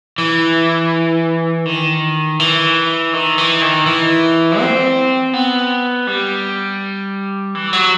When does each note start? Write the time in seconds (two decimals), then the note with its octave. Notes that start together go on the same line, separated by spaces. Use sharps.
0.18 E3
1.66 D#3
2.40 E3
3.13 D#3
3.38 E3
3.61 D#3
3.86 E3
4.60 C4
5.33 B3
6.07 G3
7.55 E3
7.73 F#3